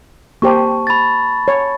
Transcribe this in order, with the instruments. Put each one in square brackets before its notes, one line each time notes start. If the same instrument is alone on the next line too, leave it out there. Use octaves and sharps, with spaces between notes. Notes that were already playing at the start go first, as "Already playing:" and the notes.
[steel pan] A#3 G4 C5 [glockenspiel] A5 C#6
[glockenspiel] B5 A6
[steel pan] C#5